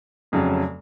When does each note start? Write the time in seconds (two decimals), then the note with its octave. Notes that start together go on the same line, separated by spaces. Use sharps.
0.32 F1 F2 C#3 F#3